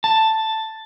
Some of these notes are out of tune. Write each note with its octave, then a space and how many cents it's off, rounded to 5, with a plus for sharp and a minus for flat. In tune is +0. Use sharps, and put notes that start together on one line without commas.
A5 +5